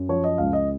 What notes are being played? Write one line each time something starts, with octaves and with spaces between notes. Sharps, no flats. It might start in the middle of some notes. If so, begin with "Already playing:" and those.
Already playing: F#2
F3 C#5
D#5
C#2 F5
D#5